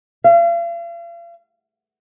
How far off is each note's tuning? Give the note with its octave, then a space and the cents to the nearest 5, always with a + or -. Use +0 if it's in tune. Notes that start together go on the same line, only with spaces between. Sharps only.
F5 -40